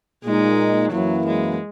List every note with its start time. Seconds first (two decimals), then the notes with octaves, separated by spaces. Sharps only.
0.25 A#2 G#3 A#3 D#4
0.92 F#2 E3 F#3 A#3 E4
1.26 G#3